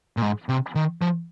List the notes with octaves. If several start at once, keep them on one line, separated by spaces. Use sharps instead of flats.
A#2
G#2
C3
D#3
F3